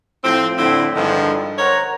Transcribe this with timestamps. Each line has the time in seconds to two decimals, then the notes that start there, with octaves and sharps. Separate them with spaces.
0.24 A2 F3 C4
0.57 A2 D3 C4 E4
0.95 G2 D3 D#3 F3 G#3
1.58 A#4 C5 C#5 F#5 A#5